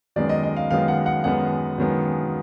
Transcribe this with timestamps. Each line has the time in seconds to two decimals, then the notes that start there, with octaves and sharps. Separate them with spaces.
0.16 F#2 D#3 G#3 B3 D5
0.29 D#5
0.43 D#5
0.56 F5
0.70 F#2 D#3 G#3 B3 F5
0.88 F#5
1.06 F#5
1.24 F#2 D#3 G#3 B3 F#5
1.78 F#2 D#3 G#3 B3